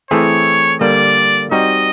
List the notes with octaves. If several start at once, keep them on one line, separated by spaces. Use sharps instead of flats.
E3 A3 C4 E4 G#4 C#5
D3 G3 A#3 D5
G3 C4 D#4 F#4 D#5